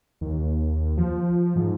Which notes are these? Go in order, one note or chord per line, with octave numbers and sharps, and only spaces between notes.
D#2
F3
G#2